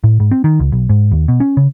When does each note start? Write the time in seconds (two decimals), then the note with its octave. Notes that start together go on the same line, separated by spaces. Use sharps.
0.04 A2
0.20 G#2
0.31 C4
0.44 D#3
0.60 C#2
0.72 B1
0.89 G#2
1.12 D#2
1.28 B2
1.40 C#4
1.57 C#3